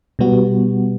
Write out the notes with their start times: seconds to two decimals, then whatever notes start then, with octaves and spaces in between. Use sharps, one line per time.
0.19 B2 G3 B3 F#4